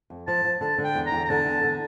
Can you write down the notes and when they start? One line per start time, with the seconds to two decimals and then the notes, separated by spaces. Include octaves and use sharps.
0.10 F2
0.27 F3 A5
0.45 F3
0.61 D3 A5
0.78 D3
0.84 G5
0.95 E2
1.06 A#5
1.12 E2
1.25 A#5
1.29 D3 A5
1.46 E2
1.63 D3